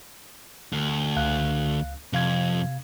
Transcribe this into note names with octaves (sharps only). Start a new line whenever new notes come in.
D2
C#2 F5 F#6
F2 C3 F5 G#6